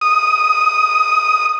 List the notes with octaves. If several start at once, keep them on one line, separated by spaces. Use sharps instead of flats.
D#6